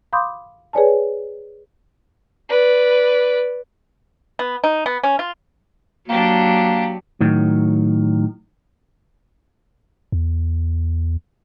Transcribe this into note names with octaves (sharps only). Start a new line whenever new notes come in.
F5 B5 C6 D6 D#6 G6
G#4 B4 C#5 D5 G#5 A5
B4 D5
B3
D#4
B3
C#4
F4
F#3 A#3 D4 G4
A2 D#3 F#3
E2